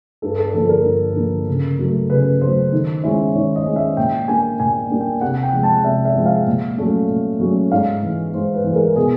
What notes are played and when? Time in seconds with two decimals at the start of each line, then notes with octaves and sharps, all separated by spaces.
0.22 G2 A4
0.38 A4
0.53 D3 F3 A#3 A4
0.69 A#4
0.85 G2
1.16 D3 F3 A#3
1.47 C#3
1.79 F#3 A3
2.10 C#3 B4
2.41 F#3 A3 C5
2.72 D#3
3.04 G#3 C#4 E4
3.35 D#3 C#5
3.56 D#5
3.66 G#3 C#4 E4
3.76 E5
3.97 A#2 G5
4.28 G3 A#3 D4 G#5
4.59 A#2 G#5
4.91 G3 A#3 D4
5.01 G5
5.21 C3 F#5
5.43 G5
5.53 F3 G#3
5.63 A5
5.84 C3 E5
6.05 E5
6.15 F3 G#3
6.26 F5
6.47 A#2
6.77 F#3 A3 C#4
7.09 A#2
7.40 F#3 A3 C#4
7.72 G#2 F5
8.03 E3 G#3
8.34 G#2 C5
8.54 B4
8.64 E3
8.70 G#3
8.75 A#4
8.96 B2 G#4